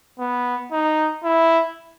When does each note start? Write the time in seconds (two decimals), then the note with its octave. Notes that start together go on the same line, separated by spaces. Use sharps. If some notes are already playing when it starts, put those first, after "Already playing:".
0.19 B3
0.72 D#4
1.24 E4